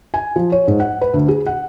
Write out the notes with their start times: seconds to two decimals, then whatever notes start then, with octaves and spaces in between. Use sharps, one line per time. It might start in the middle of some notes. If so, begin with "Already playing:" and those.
0.14 G#5
0.36 F3
0.52 C#5
0.67 G#2
0.80 F#5
1.01 B4
1.13 D2
1.28 G#4
1.46 F#5